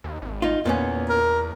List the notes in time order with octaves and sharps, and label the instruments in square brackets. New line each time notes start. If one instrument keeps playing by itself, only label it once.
[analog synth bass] D#2
G#1
[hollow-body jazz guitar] D#4 F4
[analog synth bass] E2 [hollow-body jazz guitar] A#2 B3 C#4
[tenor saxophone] A#4